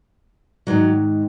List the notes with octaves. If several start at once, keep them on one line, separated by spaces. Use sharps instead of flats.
G#2 D#3 F#3